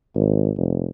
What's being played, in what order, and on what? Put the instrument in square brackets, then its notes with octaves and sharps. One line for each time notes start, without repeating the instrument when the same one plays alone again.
[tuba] G#1
F1